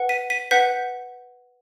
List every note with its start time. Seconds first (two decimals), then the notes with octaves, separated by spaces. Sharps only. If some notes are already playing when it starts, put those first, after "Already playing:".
Already playing: B4 F#5
0.09 B6 D#7
0.30 B6 D#7
0.51 B4 F#5 G6 B6